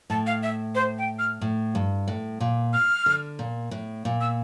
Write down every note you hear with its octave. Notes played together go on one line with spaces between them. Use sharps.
A2 A5
F5
E5
C5
G5
F6
A2
G2
A2
A#2
F6
D3
A#2
A2
A#2
E6